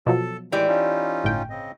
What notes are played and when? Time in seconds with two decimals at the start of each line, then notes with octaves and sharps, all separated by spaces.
0.06 B2 F3 F#3 A4 A5
0.52 A2 D#3 E3 G#3 G4 D5
0.68 C#4 D#4 F4
1.24 G1 A2 G5
1.50 C#3 C4 D#5